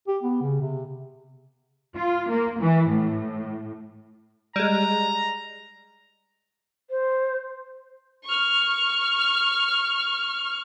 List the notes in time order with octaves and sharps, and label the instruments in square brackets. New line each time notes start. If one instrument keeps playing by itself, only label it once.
[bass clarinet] G4
B3
C#3
C3
[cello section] F4
A#3
E3
A2
[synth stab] G3 G#3 [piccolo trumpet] A#5
[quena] C5
[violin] C#6 F6